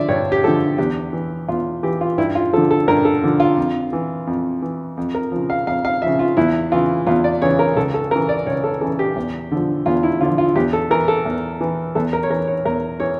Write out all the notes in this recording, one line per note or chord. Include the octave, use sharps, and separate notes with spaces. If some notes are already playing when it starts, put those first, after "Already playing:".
Already playing: D3 F3 D5 E5
G2 C#5
G4
D3 F3 A4
E2 G4
E3
E2 F4
E3 G4
F4
G2 E4
F4
D3 F3 A4
A4
G2 A#4
A4
D3 F3
F4
F2
E3
F2
E3
F2
A#4
C#3 F3
F5
F2 F5
F5
C#3 F3 E5
F4
E2 E4
C#3 E3 F4
E2 F4
D5
C#3 E3 C#5
A#4
C#2 A4
A4
C#3 E3 A#4
D5
C#2 C#5
A4
C#3 E3 A4
G4
E2
D3 F3
E2 F4
E4
D3 F3 F4
F4
E2 G4
A4
E3 A#4
A4
E2
E3
E2 A4
A#4
C#5
E3 A#4
C#5
E2 A#4
E3 C#5